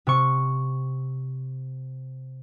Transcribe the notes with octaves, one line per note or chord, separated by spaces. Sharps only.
C3 C#6